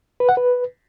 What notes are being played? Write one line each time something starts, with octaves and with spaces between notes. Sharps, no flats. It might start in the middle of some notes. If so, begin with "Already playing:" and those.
B4
F#5
B4